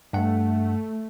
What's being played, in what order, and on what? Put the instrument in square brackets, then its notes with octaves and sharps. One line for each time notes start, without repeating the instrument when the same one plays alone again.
[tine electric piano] G2 F#5 [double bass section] A3